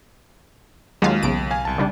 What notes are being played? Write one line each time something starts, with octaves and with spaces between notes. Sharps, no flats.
D#2 F#3 G#3 F4 F5
B1 C#3 D7
F5 G#5
C2 A5
C#3 G3 D4